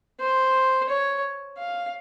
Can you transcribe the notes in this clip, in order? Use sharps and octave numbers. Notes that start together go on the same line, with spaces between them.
C5
C#5
F5